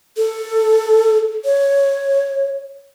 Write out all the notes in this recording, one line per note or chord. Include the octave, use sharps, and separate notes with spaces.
A4
C#5